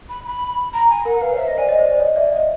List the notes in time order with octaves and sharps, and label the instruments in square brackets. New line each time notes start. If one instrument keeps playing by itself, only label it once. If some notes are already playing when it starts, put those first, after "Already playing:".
[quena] B5
B5
A#5
G#5
[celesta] A#4 [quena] F#5
[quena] F#5
[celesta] B4 [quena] F5
[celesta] C#5
[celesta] C5 [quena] E5
[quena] D#5
[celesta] C5 D5 [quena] G#5
[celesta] C#5 D#5
C5 D5
C5 D5
C#5 D#5
D5 E5
D#5 F5